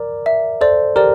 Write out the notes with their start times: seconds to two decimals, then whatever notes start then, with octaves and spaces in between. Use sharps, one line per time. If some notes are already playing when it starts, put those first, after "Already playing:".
Already playing: A#4 D5
0.26 E5
0.61 A4 C5 D5
0.96 G4 A#4 D5